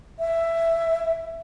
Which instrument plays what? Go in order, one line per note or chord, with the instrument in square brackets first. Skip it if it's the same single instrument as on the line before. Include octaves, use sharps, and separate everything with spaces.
[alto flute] E5